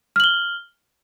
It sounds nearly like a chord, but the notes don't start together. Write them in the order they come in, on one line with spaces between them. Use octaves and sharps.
F6 F#7 G7